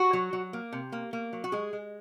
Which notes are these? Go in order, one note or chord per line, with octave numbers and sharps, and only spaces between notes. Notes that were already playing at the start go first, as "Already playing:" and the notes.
Already playing: F#4
F#3
F#3
A#3
C3
A#3
A#3
F#3
F#4
G#3 G#4
G#3